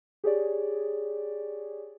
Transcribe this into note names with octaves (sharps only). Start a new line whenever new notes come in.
G4 G#4 C#5 D5